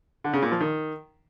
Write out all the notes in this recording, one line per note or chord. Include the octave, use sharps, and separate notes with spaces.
D3
C#3
A#2
F3
D#3